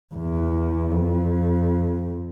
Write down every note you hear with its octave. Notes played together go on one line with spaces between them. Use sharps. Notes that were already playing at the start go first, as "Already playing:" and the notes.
E2
F2